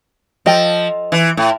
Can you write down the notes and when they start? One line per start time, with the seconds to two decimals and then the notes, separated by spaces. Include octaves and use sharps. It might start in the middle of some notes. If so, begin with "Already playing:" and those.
0.46 F3 A4 D#5 G5
1.12 E3
1.37 A2